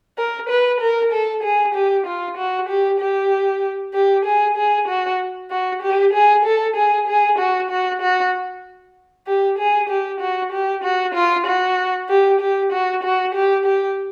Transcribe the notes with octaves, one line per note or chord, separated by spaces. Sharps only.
A#4
B4
A#4
A4
G#4
G4
F4
F#4
G4
G4
G4
G#4
G#4
F#4
F#4
G4
G#4
A4
G#4
G#4
F#4
F#4
F#4
G4
G#4
G4
F#4
G4
F#4
F4
F#4
G4
G4
F#4
F#4
G4
G4